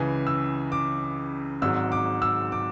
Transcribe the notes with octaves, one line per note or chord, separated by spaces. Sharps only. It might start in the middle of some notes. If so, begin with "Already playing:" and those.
Already playing: C#2 C#3 E3 G#5
E6
D6
G#1 G#2 F#3 E6
D6
E6
D6